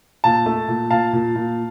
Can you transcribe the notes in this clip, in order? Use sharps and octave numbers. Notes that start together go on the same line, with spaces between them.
A#2 F5 A5
A3
A#2
A#2 F5 A5
A#2
A#2